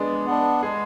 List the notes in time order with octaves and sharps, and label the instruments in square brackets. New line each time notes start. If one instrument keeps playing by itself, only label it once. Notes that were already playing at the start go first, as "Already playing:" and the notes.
Already playing: [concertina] G#3 [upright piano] B3 D4
[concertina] B3 D4
[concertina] G#3 [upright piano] G#4